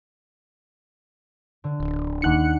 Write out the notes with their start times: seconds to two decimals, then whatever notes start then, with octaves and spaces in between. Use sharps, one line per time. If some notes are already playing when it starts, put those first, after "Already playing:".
1.64 D3
1.80 D1
2.22 D#2 D4 D#4 F#5 F#6 C#7